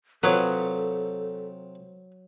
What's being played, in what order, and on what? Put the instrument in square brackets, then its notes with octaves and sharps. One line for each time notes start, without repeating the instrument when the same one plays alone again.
[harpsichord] C3 F4 D#6 [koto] F#3 [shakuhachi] A4 [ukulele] B4 C#5